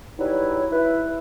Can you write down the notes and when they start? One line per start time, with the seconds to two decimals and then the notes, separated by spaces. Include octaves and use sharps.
0.19 F#3 G3 D#4 E4 B4 C#5
0.72 E4 B4